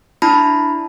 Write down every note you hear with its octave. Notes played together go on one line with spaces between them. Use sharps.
D4 E4 A5 B5